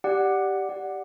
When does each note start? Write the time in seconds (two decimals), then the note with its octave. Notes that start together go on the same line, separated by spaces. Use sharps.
0.04 G4 D5 F#5
0.69 G4 D5 F#5